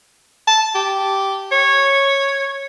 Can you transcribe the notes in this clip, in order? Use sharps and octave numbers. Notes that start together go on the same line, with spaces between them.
A5
G4
C#5